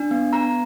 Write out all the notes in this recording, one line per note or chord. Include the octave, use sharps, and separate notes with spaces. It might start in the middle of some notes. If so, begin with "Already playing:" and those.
Already playing: D4
B3
B3 A#5